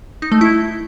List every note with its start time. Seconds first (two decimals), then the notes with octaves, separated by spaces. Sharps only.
0.22 D#4
0.32 A3
0.41 E4